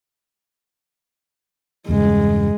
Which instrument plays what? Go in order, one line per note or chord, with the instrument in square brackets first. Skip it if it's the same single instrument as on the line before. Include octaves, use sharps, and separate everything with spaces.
[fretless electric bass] E2 G2 C#3 [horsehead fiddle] G#3